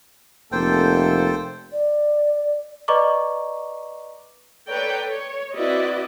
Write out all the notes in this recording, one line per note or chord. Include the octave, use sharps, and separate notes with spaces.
F1 A#3 A4 C5 G5
D5
B4 D5 D#5 A#5 C#6 D6
A4 B4 C#5 D5 G5 A#5
C#5
C4 E4 F#4 B4 D5 D#5